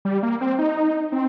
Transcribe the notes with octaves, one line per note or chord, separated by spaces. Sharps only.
G3
A#3
C4
D#4
C4